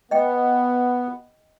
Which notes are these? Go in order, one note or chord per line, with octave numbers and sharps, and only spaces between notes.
B3 D#5 G5